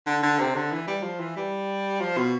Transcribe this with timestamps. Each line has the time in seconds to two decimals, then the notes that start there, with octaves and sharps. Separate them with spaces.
0.06 D3
0.23 D3
0.39 C3
0.55 D3
0.72 E3
0.87 G3
1.03 F3
1.20 E3
1.36 G3
2.01 F3
2.17 B2